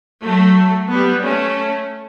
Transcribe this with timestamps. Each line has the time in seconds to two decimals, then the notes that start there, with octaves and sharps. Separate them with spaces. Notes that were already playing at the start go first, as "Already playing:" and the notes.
0.24 F#3 A3
0.90 G3 B3
1.23 A3 C#4